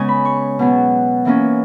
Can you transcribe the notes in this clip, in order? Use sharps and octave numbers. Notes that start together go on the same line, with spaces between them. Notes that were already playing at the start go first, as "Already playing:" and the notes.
Already playing: C#3 G#3 B3 C#4 D#5 G#5
B5
C#6
B2 F#3 B3
E3 A#3 C#4